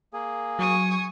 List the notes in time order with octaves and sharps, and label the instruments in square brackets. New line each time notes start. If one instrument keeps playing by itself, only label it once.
[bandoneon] A#3 G#4
[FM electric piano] F#3 [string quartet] G#5 C#6 D#6